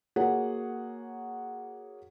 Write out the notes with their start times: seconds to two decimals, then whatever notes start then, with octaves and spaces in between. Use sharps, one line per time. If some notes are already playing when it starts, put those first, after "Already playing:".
0.16 A#3 F#4 G#4 C#5 F#5